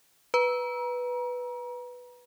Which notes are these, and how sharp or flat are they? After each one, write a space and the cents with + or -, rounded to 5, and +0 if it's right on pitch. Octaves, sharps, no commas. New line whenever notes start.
B4 +0 A#5 +35